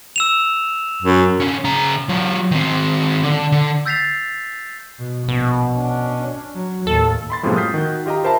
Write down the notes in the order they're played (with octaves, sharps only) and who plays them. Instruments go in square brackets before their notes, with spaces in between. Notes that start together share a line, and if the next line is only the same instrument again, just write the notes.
[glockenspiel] E6 E7 F7
[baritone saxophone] F#2
[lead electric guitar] D3 C#4
C#3 A#5
F#3 F4
D#3 C4
D3
D3
[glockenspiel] E6 G6 A6 B6 C7 F7
[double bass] B2
[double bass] A#1 [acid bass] B2
[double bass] C#4 D4
F#3
[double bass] D#2 A2 [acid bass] A4
[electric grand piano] B5 C6 A6
F#2 A2 C3 F3 G#3 A#3
D#6 F6 G6 A6 B6 C7
D#3 F#4 G6
F4 G4 D#5 G5 A#5
A#4 C5 E5 A5 B5